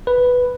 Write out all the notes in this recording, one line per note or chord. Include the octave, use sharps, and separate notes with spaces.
B4